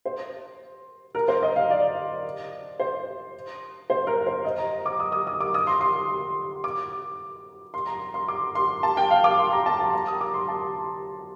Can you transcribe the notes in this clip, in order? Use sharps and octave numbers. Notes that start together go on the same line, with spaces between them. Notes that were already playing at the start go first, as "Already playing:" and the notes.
C5
A#4
C5
D#5
F5
D5
C5
C5
A#4
C5
D#5
A#5
D6
D#6
D#6
D#6
D6
D#6
C6
C6
D6
C6
A#5
C6
D6
C6
A5
G5
F5
D6
C6
A#5
A5
A5
A#5
D#6
D6
C6
A5